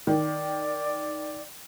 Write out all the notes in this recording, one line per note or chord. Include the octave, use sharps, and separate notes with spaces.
D#3 D5